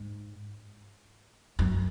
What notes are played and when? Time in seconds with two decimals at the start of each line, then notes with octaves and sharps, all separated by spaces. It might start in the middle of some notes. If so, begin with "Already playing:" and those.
Already playing: G#2
1.59 F#2